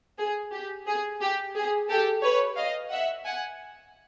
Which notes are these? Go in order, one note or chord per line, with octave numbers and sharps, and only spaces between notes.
G#4
G4
G#4
G4
G#4
G4 A4
B4 C#5
D#5 F5
E5 F#5
F#5 G#5